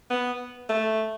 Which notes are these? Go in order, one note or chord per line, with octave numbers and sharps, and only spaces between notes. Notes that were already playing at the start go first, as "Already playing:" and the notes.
B3
A3